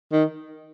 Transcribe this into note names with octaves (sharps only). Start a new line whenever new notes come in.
D#3